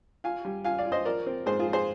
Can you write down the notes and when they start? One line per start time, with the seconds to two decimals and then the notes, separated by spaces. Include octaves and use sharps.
0.24 F4 F5 G#5
0.45 G3
0.65 F4 F5 G#5
0.78 D5 F5
0.85 F4
0.92 C5 D#5
1.05 F3 A#4 D5
1.26 C4
1.46 G#2 G#4 C5
1.60 F4 G#4
1.66 F3
1.73 G#4 C5